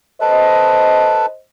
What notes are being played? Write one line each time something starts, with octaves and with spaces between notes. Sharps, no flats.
A4 B4 C5 D#5